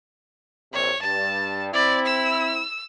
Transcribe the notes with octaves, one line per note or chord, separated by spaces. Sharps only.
A#1 C3 C#5
G2 A5
C4 E4 D5
E6